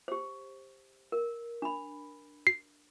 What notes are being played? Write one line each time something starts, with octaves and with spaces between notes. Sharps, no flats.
G4 C5
A#4
D4 B5
C7